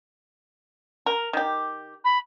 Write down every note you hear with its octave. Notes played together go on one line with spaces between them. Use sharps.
A#4
D#3 G4
B5